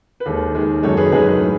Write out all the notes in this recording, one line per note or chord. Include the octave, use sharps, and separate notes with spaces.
B4
D#2 D#3 G#3 A4
D#2 D#3 G#3
F#2 D#3 G#3 A4 C#5
G#4 B4
F#2 D#3 G#3 G#4 B4
A2